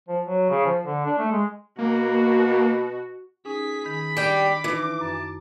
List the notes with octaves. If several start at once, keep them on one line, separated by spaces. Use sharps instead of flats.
F3
F#3
C#3
F3
D3
D4
A3
G#3
B2 A#3 F#4
C#4 D#4 G#4 B6
D#3 B5
G3 D4 G5 D6
E3 D#4 E4
F#2 A5